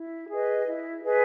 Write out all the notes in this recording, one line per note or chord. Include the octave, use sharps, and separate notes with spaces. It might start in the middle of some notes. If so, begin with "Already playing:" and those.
Already playing: E4
G#4 B4 D#5
E4
G#4 B4 D#5